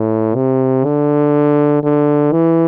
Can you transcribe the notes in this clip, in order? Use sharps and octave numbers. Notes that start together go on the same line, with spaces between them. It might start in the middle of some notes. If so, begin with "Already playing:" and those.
Already playing: A2
C3
D3
D3
E3